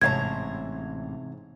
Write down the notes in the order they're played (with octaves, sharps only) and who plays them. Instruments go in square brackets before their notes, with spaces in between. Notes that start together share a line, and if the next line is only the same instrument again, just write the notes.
[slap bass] A1 [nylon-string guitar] G#2 C#5 A5 [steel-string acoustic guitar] C3 F5 A#5 [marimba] G#6